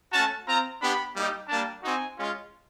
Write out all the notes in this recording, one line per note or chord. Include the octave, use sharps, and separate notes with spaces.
A3 C#4 F#4 A5
C4 F4 A#5
B3 D4 G4 B5
G3 A#3 D#4 G4
G3 A#3 D4 A5
C4 D#4 F#4 G#5
G#3 C#4 F4